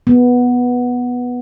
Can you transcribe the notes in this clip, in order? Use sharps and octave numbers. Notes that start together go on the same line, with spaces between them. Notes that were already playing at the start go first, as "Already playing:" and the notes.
B3